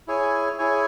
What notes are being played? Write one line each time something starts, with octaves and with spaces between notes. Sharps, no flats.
E4 G#4 C#5 G#5
E4 G#4 C#5 G#5